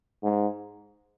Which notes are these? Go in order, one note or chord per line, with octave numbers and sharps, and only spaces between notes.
G#2